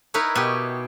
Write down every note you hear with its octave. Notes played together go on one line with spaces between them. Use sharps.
D#4 E4 A#4 B4 C#5
B2 G4